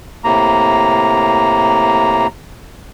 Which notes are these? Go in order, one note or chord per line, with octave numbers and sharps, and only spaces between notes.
A2 C3 A#3 A#5